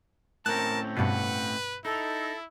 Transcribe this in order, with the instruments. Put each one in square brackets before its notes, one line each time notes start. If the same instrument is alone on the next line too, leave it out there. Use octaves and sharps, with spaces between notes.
[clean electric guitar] A2 C4 C#4 [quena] A#4 [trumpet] A5 [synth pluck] F#6
[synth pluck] G2 B2 [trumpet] B4 [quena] F#5
[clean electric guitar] D#4 [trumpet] E4 [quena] A4